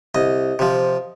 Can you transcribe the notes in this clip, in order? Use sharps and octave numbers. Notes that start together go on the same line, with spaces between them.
C2 D#5
C3 F3